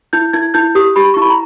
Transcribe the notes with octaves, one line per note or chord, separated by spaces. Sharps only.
E4 G6
E4 G#6
E4 G6
G4 D#6
G4 B5
E4 C#6
B5
A#5